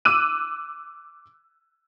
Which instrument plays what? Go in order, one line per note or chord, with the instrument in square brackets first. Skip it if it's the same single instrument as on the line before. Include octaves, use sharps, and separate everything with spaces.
[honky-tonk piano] D6 E6 F#6 D#7